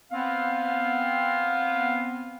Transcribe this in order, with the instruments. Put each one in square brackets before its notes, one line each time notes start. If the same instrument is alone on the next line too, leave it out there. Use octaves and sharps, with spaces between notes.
[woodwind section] B3 C4 F5